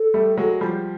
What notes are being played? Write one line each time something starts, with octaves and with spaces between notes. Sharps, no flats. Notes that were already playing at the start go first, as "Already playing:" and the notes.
Already playing: A4
G3 A3
F#3 G#3
F3 G3